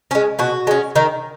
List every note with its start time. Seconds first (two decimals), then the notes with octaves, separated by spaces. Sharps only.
0.11 G#3 C#4
0.39 B2 F#4
0.67 G#3 C#4
0.96 D#3